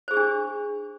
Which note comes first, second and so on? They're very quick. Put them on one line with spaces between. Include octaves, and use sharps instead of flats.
C5 G#4 G4 D4